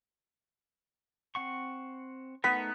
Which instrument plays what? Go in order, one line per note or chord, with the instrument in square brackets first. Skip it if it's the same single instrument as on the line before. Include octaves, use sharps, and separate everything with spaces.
[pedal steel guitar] C4 F#5 C#6
[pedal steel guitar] A3 D#4 A#4 [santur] B3 [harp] B6